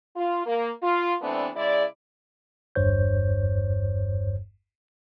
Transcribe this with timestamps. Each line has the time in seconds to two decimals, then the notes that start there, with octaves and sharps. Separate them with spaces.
0.16 F4
0.47 A#3
0.83 F4
1.22 E3 G3 A3 B3 C4 D4
1.56 C#3 G#3 E4 D5
2.75 G1 E2 G2 C5 C#5 G6